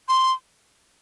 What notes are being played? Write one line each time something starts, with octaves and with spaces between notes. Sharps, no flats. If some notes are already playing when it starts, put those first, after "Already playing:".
C6